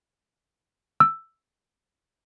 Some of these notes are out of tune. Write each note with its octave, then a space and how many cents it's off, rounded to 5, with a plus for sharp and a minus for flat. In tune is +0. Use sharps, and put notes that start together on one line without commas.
E6 +5